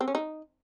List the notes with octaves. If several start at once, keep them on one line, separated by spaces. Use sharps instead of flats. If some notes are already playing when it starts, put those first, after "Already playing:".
C4
C#4
D#4